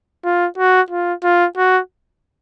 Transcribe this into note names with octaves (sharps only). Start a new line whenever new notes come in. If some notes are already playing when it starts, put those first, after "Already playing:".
F4
F#4
F4
F4
F#4